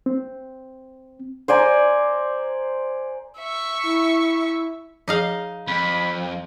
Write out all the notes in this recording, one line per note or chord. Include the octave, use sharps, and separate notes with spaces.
C4
C5 D5 G#5 A#5
E5 C#6
E4
F3 D#4 G#4 D#5 F5
F2 B5